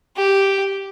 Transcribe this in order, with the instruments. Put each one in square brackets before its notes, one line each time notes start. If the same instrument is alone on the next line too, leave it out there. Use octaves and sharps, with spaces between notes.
[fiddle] G4